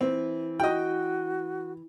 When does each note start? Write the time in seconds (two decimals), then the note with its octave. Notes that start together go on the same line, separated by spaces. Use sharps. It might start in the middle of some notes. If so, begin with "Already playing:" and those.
0.01 E3 C4
0.60 F#4 D#5 G5